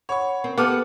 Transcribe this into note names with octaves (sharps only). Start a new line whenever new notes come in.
C#5 F#5 B5 C#6
C4 A#4
B3 G4 A4 F#5 D6 F6